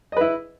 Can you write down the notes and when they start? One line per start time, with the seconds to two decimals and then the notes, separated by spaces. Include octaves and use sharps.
0.12 D#5
0.17 B4
0.21 E4